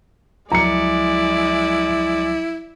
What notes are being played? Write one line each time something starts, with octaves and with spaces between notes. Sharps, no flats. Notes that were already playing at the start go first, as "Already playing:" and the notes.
C#2 F3 F#3 G#3 E4 D5 A#5 C#7